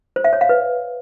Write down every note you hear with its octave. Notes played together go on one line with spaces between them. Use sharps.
C5
E5
C#5
F5
B4